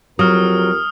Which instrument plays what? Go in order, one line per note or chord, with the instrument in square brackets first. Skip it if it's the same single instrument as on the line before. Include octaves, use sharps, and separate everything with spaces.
[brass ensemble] F2 G4 A#4 [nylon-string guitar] F#3 [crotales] D#6 F6